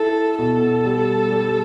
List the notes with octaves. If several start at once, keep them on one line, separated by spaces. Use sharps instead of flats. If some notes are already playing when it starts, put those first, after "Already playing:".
Already playing: E4 A4
B2 A4
G3
G3